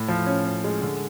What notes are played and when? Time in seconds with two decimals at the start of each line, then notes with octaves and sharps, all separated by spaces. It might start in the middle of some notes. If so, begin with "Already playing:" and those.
Already playing: A2
0.08 F3
0.26 C#4
0.45 C#4
0.64 G#3
0.81 D3